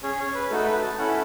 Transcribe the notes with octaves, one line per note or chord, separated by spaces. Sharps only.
C#4 G#4 C#5
C#5
B4
A3 D#4 F#4 A4
B4
A5
C#4 E4 A4 F#5
B5